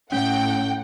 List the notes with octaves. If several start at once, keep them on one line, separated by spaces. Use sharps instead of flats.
A2 C#4 F#5 G5